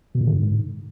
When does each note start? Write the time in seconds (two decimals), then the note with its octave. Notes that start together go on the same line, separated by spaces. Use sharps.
0.15 B2
0.21 A#2
0.27 D3
0.33 G2
0.39 G#2